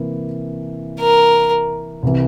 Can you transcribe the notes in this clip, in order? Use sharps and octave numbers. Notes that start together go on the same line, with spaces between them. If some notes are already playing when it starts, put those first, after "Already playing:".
Already playing: C3 E3 A#3 E4
A#4
C2 C3 E3